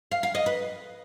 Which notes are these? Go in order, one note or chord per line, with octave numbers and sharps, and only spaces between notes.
F5
F5
D#5
B4